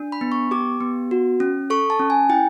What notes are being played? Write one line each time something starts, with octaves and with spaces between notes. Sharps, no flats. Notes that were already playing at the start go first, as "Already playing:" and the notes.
Already playing: D4
B5
B3
C#6
G4 D6
B3
F#4
C#4
A4 C#6
A5
C#4
G#5
E4 G5